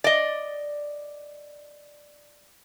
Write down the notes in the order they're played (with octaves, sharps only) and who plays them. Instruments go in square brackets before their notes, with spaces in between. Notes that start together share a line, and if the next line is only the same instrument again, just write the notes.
[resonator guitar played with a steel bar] D5 D#5